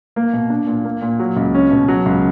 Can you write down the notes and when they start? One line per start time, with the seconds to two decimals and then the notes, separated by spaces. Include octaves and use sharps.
0.16 A#3
0.33 B2
0.50 D4
0.67 A#2
0.84 A#3
1.02 A#2
1.19 F#3
1.37 C#2
1.55 C#4
1.71 B2
1.88 F#3
2.06 C#2